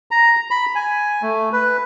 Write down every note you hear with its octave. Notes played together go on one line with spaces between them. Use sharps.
A#5
B5
G#5
A3
B4